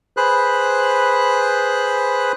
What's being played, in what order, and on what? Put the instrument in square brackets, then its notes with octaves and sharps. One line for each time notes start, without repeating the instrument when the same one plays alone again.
[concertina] G#4 B4 C5 B5 F#6